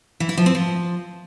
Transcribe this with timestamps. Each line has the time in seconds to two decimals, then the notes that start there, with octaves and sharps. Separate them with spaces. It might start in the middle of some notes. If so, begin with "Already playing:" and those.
0.20 E3
0.29 E4
0.37 F3
0.46 C4
0.55 F3